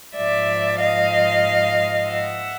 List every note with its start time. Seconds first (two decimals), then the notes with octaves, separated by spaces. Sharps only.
0.16 G#2 F3 D5 E5
0.80 D#5 F5
2.10 E5 F#5